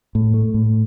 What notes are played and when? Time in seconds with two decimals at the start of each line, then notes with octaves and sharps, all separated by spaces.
0.15 A2
0.34 A3
0.54 A2